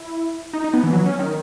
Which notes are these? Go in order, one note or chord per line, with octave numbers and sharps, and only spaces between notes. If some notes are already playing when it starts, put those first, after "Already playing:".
Already playing: E4
D#4
D#4
B3
E3
F#3
C#4
D#3